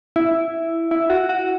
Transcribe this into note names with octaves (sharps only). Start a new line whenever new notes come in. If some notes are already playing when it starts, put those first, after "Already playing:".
E4
E4
F#4
F#4